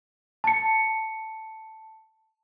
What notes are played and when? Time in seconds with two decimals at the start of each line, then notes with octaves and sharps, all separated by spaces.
0.44 A5 C#7